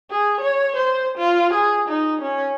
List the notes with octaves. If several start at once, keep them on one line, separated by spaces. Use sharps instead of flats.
G#4
C#5
C5
F4
G#4
D#4
C#4